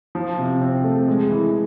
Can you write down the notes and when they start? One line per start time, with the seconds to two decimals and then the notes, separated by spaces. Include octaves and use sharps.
0.15 F3
0.38 C3
0.61 C4
0.84 A3
1.08 G#3
1.30 E3